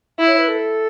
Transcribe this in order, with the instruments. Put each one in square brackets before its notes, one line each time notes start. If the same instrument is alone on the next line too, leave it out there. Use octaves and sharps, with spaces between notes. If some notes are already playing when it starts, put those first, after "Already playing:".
[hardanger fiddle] E4
[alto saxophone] C#5
B4
A4